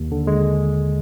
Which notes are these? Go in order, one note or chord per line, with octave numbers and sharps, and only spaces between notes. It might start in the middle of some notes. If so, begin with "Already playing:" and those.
Already playing: D#2
D3
G#3